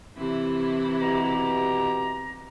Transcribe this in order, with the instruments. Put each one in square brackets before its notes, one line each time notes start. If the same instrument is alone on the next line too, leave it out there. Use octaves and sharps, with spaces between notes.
[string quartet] C3 E3 E4
[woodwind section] B2 G4 A#5